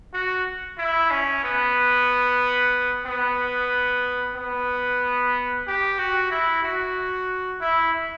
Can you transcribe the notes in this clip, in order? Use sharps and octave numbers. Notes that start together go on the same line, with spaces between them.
F#4
E4
C#4
B3
B3
B3
G4
F#4
E4
F#4
E4